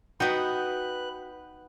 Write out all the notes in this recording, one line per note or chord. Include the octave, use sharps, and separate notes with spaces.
B3 D#4 F#4 B4 G5 F#6